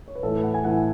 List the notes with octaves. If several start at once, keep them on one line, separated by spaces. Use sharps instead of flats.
C#5
B4
A2 E3 A3 A4
B4
F#5
G#5
A2 E3 A3 F#5